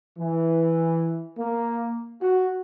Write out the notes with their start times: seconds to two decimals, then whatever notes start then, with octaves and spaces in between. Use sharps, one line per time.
0.18 E3
1.39 A#3
2.21 F#4